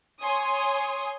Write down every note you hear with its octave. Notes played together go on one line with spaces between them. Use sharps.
C#5 G#5 C6 D#6